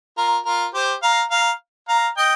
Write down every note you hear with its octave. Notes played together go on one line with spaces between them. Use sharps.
F4 A#4
F4 A#4
G4 C5
F5 A#5
F5 A#5
F5 A#5
D#5 G5